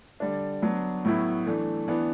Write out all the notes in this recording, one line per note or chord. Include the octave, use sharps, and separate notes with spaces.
D3 G3 D4
F#3 B3 D4
A2 F#3 B3 E4
E3 A3 D4
E3 B3 D4